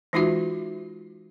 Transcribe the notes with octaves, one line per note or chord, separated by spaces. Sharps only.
E3 G#3 D#4 F4 F#4 E5